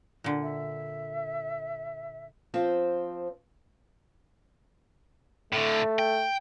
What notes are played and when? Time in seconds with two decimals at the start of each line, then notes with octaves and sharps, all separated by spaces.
0.24 A#2 D3
0.42 E5
2.54 F3 C4 C5
5.53 A2 D3 A3
5.99 G5